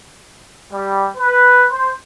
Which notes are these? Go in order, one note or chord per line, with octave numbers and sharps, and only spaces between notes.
G3
B4
C5